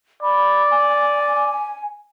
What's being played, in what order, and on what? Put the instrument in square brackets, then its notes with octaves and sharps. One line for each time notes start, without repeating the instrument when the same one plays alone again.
[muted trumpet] D5 [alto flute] B5
[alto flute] G#5